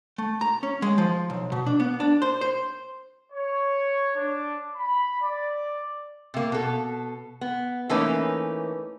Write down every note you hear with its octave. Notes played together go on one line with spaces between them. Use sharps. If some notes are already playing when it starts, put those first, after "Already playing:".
A3
A#5
C#4
G#3
F3
B1
B2
D4
B3
D4
C5
C5
C#5
D4
B5
D5
C3 A#3
B2 A4
B3
E3 A3 A#3 C#4 D#4 B4